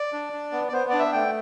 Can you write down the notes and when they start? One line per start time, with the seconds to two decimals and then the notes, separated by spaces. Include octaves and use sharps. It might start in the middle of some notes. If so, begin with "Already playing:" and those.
Already playing: D5
0.13 D4
0.33 D4
0.52 B3
0.69 D5
0.73 B3 C5
0.90 D4 D5
0.99 E5
1.13 A3 G5